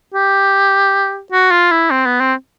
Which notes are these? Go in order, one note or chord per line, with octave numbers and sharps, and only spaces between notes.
G4
F#4
F4
E4
C4
B3
C4